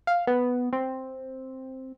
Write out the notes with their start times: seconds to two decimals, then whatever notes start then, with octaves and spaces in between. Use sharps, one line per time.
0.07 F5
0.27 B3
0.73 C4